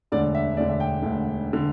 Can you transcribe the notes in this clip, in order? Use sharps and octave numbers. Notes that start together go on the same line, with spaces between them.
E1 D2 D3 D5
E5
E1 D2 D3 D5
E5
G5
E1 D2 D3
D3